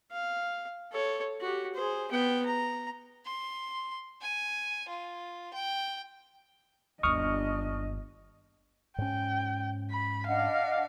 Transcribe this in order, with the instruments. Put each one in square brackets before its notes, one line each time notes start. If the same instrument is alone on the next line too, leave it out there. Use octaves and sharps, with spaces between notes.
[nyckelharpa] F5
A4 C#5
F#4 G4
G#4 C5
B3 G5
A#5
[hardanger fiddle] C6
G#5
F4
G5
[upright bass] G1 D#2 [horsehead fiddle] D4 D#5 [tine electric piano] C#6 D#6 F6
[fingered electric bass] G#2 C#4 [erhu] G5
[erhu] B5
[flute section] D4 D#5 F#5 [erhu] F5